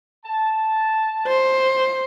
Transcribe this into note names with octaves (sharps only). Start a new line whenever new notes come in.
A5
C5